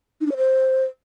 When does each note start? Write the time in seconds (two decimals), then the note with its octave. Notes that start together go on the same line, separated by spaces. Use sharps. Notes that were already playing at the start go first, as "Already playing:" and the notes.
0.21 D#4
0.26 D4
0.32 C#5
0.37 C5